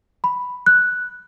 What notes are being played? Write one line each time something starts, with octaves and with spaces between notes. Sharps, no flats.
B5
F#6